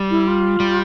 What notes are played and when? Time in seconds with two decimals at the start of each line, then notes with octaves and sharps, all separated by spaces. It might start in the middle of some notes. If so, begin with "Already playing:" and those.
Already playing: G3
0.10 E4
0.27 F4
0.60 G3